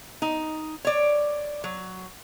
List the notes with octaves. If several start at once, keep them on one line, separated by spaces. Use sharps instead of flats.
D#4
C#5 D5
F#3